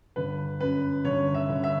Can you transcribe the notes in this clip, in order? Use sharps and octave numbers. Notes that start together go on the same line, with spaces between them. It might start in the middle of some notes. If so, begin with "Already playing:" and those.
G1 B4
F#2 B4
G1 C#5
E5
G1
E5